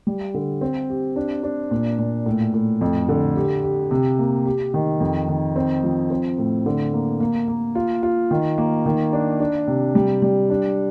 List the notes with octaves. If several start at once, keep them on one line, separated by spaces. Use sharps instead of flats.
G3
D3
C4
G4
D4
D4
A#2
A#2
A2
A2
F2
D3
G4
G4
C3
A#3
G4
D#3
F2
D#3
C4
F3
C4
A2
D3
A#3
A#3
A#3
F4
F4
D#3
A#3
D#3
D4
D4
C3
G3
G3
D4